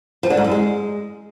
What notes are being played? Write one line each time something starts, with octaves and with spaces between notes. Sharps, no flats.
F3
D3
G#2
F#2
G#3